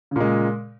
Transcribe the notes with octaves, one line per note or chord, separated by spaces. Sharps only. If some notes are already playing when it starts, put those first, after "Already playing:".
A#2 C#3 G#3